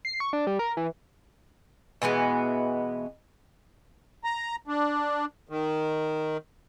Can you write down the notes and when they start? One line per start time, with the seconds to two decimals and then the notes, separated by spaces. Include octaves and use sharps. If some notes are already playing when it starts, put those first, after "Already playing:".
0.05 C7
0.20 C#6
0.33 D4
0.47 G3
0.59 A#4
0.77 E3
2.02 B2 E3 G#3 B3
4.24 A#5
4.67 D4
5.49 D#3